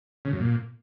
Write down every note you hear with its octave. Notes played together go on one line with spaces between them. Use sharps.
C#3
F#2
A#2